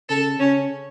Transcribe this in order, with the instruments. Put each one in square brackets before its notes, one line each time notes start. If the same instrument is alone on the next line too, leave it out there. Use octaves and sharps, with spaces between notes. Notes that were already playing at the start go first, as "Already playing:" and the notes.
[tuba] C#3 [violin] A4
[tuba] C#3 [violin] C#4